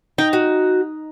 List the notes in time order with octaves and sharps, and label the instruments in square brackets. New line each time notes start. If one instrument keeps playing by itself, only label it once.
[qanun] D#4 [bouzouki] G5
[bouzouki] F#4